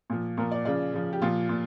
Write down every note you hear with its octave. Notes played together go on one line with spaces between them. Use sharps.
A#2 F3
A#2 F3 A#4
D5
C#3 F3 D5
C#3 F3
G4
A#2 F3 F4
A#2